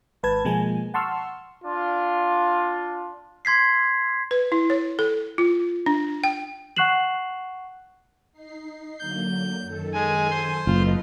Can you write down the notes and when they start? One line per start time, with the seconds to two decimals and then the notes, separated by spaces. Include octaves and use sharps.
0.23 G#1 G#2 B4 A5 G#6
0.45 B2 F3 G#3 A#3 G#5
0.94 F#5 A5 C6 C#6 E6 F6
1.65 D4 F4
3.45 C6 G#6 B6 C7
4.31 B4
4.52 E4
4.70 C#5
4.99 A4
5.38 F4
5.86 D4
6.24 G5
6.77 F#5 C#6 F#6 C7 E7 F#7
8.33 D#4 C7
8.99 D3 F#3 A#3 G6
9.60 F#2 D#3 A4
9.94 G#3 G#5
10.30 C5 C6
10.67 F#1 F4 A4 B4 D#5